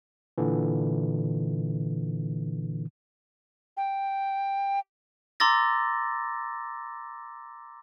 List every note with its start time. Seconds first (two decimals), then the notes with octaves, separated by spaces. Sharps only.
0.38 A#2 D3 E3
3.77 G5
5.40 A#5 C6 D6 E6 A6 A#6